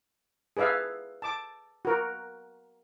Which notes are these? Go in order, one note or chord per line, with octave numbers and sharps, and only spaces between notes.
G#4 B4 D5 E5 F5
A5 D6
F#4 A#4